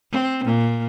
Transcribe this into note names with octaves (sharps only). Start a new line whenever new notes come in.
C4
A#2